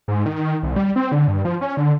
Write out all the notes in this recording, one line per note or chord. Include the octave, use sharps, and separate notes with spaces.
G#2
D#3
C2
G3
C4
D3
G2
F3
C#4
D3